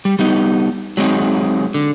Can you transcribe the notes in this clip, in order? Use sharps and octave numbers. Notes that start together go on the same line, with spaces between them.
G3
G3 B3 D#4
F#3 G#3 C4 D#4
D3